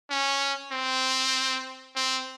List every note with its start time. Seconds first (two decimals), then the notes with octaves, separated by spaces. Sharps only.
0.10 C#4
0.72 C4
1.96 C4